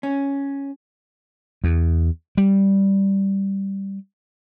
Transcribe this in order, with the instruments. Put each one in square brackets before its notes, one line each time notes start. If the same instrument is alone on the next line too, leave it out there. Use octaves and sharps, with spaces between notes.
[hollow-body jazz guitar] C#4
[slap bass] E2
G3